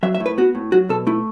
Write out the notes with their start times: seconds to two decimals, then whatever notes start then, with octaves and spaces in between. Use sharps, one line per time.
0.03 F#3 E5
0.15 E5
0.20 A2
0.26 B4
0.38 B3 F#4
0.55 A2
0.72 F#3 F#4
0.89 B2 A4
1.07 A3 E4